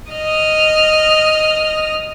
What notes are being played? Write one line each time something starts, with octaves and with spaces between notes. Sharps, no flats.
D#5 F6